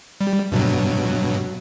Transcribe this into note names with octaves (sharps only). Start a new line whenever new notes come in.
G3
G2 B2 F#3